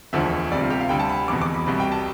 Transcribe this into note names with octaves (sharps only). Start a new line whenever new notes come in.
E1 D2 D3 F3 E5
D2 C3 G3 D5
F4
G4
F5
D2 D3 G3 G5
A5
B5
F1 E2 B2 D6
D6
B5
C2 B2 G3
G5
A5